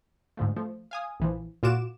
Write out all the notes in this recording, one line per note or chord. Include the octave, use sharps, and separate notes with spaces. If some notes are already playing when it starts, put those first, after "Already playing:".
G#2 D3 F3 A3
F3 A3
F5 G#5 D#6
A#1 E3 F3
A#2 F4 F#4 D6 E7